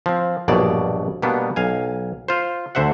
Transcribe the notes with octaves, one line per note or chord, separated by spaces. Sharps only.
F3 C4
A#1 G2 B2 F#3 D5
B2 G3 A#3 B3 D4
B1 F5 G#5
F4 C5
D2 D3 C5 E5 F#5